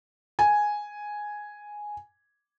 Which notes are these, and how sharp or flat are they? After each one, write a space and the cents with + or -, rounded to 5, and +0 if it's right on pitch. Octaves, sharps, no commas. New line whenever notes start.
G#5 +0